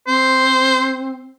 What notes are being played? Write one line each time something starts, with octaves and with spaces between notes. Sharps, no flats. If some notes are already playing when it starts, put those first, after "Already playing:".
C4 C5